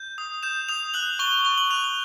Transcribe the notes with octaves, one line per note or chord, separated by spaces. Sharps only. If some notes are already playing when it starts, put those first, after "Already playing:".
Already playing: G6
D#6
G6 E7
D#6 F7
F#6 F#7
C#6 G7
C#6 G7
F#7
F#6 F7
G7